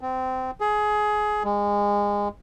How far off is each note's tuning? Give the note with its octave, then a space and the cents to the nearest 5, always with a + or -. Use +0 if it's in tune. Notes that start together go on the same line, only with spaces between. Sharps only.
C4 -20
G#4 +20
G#3 -25